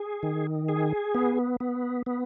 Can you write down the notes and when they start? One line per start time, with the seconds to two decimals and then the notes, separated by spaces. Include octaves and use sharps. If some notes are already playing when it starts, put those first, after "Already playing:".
Already playing: G#4
0.23 D#3
0.69 G#4
1.15 B3
1.60 B3
2.06 B3